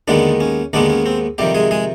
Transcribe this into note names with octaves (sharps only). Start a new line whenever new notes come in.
D#2 D3 D#3 G#3 B3 D4
C#4
D#2 D3 D#3 G#3 B3 D4
C#4
C4
F2 C3 D#3 G3 G4
G#3 G#4
G#3 G#4